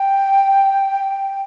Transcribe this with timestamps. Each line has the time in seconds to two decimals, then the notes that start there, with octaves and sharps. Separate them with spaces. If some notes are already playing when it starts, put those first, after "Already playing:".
Already playing: G5